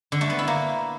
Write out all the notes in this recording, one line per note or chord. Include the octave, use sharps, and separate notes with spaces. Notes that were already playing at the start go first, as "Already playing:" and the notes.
D3
A3
B3
E4
A#3